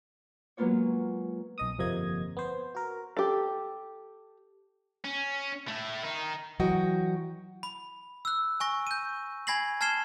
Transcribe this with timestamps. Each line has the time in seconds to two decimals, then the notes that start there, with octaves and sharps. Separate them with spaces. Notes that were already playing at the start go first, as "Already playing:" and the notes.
0.57 F#3 G#3 A#3 B3 F4 C#5
1.58 B1 D#5 D#6
1.78 G1 F2 C3 A#3 D#5 G#6
2.37 B3 C5
2.75 F#4 A#4
3.17 G4 A4
5.05 C#4
5.68 A3 E4
6.03 D#3 D#4
6.60 E3 F#3 F#4 D#5 G5
7.63 B5
8.25 E6 F#6
8.60 G#5 C#6 A#6
8.87 G6 D#7
9.47 G#5 B5 G#6 A#6 C7 F#7
9.81 A5 F6 G#6 C7 E7 G7